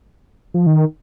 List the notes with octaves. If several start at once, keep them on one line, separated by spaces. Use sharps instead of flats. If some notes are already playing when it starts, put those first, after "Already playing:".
F3
D#3